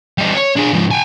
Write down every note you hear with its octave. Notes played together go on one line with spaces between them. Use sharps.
G3 D#4
C#5
D4 G#4
G#2 F3
G5 G#5